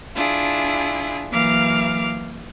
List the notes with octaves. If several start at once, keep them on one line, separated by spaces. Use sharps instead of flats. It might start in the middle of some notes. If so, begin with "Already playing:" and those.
D4 E4 F4 G#4
E3 F#3 A#3 F5 D6 F6